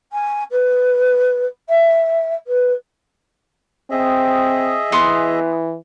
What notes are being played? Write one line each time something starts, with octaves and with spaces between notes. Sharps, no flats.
G#5
B4
E5
B4
C4 G#4 D#5 E5
E3 B3 C6